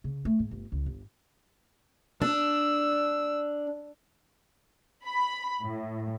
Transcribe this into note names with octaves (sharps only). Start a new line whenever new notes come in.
C#3
A3
G#2
G1
C#2
G1
D4 E6
B5
A2